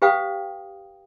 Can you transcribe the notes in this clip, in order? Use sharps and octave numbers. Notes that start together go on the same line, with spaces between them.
G4 B4 F5 G5 D#6